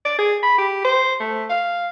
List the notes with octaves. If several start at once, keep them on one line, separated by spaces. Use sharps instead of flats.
D5
G#4
B5
G4
C5
A3
F5